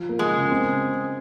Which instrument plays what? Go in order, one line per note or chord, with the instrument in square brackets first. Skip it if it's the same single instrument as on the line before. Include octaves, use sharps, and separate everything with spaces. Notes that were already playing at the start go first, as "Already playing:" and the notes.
Already playing: [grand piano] F3
A#3
[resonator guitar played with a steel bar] G#3
[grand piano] C#3
C4